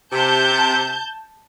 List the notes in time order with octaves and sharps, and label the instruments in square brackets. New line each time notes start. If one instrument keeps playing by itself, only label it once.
[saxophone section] C3 [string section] A5 G6